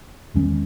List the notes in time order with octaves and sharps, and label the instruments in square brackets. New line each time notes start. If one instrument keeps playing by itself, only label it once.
[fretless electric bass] E2 D#3 G#3 C#4